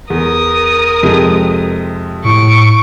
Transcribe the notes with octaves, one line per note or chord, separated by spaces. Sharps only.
E2 A#4 D#6
F2 C3 G#3
A2 C#6 D7